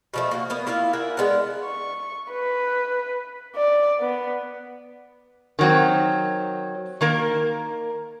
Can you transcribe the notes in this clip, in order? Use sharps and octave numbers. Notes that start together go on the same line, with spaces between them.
B2 F3 A3
A#3 F#4
A#3 B3
A#3 E4 F4 F5
A#4 E5 F#5 G#5
G#3 B3 D4 A#4
C#6
B4
D5
B3
D#3 F#3 C4
D#3 A#3 A#4